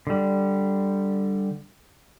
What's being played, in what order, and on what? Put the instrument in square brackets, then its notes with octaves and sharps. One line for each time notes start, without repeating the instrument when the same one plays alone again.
[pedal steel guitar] D3 G3